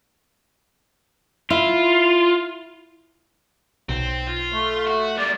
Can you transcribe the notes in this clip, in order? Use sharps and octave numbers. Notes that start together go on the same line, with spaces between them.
E4 F4
B1 C4
F4
A3
F#4
G3 A#3 D5